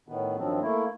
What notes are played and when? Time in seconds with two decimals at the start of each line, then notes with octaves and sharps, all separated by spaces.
0.08 A2 D#3 B3
0.37 G2 D#3 F3 F#3 C4
0.62 A3 A#3 E4